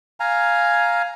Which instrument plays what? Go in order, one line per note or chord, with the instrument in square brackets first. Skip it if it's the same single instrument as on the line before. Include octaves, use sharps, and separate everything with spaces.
[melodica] F5 G#5 A#5